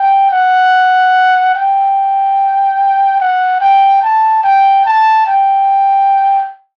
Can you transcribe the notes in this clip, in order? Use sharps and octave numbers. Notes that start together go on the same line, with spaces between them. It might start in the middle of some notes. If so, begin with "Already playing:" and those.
Already playing: G5
F#5
G5
F#5
G5
A5
G5
A5
G5